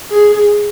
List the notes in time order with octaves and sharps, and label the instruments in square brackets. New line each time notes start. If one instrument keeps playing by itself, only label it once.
[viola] G#4